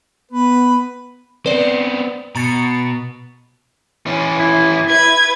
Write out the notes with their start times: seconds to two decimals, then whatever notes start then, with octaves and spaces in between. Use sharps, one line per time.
0.31 B3 B4
1.46 B3 C4 B4 D5
2.36 B2 A#5 A6 C#7
4.06 E3 C#4
4.40 E4
4.90 B4 G#6